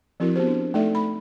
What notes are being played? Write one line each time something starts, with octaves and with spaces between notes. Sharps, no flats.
F3 C4 E4 F#4 A#4
B3 F#4 G4 C5
D4
A3 D#4 A4 D5 E5
B5